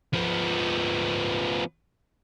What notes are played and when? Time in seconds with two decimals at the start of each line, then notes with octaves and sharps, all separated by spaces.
0.13 F3 B3